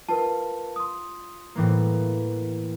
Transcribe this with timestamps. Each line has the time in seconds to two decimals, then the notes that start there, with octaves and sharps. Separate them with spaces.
0.09 F4 A#4 B4 A5
0.76 C6 D#6
1.55 A2 E3 A#3